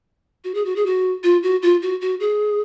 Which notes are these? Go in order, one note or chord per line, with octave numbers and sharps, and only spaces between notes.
F#4
G#4
F#4
G#4
F#4
F4
F#4
F4
F#4
F#4
G#4